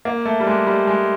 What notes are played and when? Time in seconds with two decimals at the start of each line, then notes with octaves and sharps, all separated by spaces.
0.05 A#3
0.25 A3
0.40 G3
0.47 G#3
0.67 G3
0.87 G#3